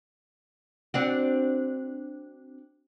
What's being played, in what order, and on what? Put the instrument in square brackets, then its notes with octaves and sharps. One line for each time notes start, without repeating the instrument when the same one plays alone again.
[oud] C4 D4 F#4